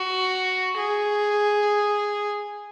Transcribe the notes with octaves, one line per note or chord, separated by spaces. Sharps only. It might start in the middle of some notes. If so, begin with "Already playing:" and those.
Already playing: F#4
G#4